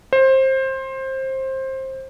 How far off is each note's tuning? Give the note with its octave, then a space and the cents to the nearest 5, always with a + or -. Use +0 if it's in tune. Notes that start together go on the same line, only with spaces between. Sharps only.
C5 +20